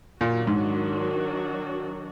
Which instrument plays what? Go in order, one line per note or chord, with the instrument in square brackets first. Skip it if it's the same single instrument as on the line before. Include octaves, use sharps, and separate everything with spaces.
[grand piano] A#2 [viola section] D#3 F#3 D4 F#4
[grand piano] G#2